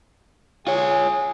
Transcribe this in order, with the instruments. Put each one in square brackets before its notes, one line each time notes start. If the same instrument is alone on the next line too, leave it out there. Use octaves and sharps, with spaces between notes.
[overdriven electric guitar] F4 C#5 [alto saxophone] G#4